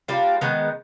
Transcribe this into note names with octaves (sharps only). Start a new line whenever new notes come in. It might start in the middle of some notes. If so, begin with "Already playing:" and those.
G3 A#3 D4 F4
D#3 G#3 B3